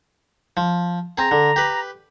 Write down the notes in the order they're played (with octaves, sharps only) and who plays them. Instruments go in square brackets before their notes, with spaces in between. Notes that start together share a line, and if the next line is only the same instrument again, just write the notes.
[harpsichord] F3
[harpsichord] C4 G#4 [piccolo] A#5
[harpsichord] D3
G4 B4